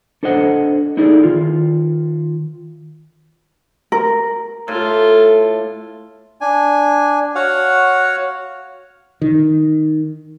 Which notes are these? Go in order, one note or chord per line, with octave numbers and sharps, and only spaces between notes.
D4 A4 C5 D#5 F#5
D#4 E4 G#4 A4 D5
D#3 F4
A#4
A2 F4 A4
D4 G#5
F#4 C#5 F5 F#5
D#3